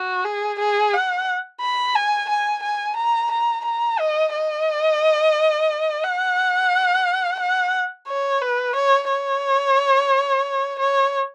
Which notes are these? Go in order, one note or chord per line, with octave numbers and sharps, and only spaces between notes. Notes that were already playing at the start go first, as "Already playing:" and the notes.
Already playing: F#4
G#4
G#4
F#5
B5
G#5
G#5
G#5
A#5
A#5
A#5
D#5
D#5
F#5
F#5
C#5
B4
C#5
C#5
C#5